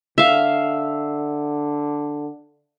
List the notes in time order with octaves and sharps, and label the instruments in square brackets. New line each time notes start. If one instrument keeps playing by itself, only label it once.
[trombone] D3 [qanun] E5 F5